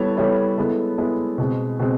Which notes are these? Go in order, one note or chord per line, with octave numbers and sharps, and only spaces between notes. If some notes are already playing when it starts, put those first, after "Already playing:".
Already playing: G3 B3 E4 A4 C#5
G3 B3 E4 A4 C#5
G#3 B3 E4 A4
G#3 B3 E4 A4
B2 G#3 C4
B2 G#3 C4